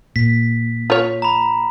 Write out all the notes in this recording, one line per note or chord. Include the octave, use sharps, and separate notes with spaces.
A#2 B6
F4 C#5
A#5 B5